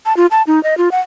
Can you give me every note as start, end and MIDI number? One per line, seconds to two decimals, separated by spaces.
0.06 0.15 81
0.17 0.26 65
0.31 0.42 81
0.47 0.62 63
0.63 0.77 75
0.78 0.91 65
0.92 1.00 78